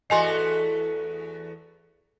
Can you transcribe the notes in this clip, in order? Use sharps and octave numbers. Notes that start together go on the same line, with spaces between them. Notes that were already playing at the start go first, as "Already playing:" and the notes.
E2 A3 F#4 D#5 G#5 C6